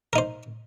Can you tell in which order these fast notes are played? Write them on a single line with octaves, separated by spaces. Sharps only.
A#4 D#4 C5